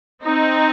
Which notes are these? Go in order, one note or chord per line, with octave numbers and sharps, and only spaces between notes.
C4 D#4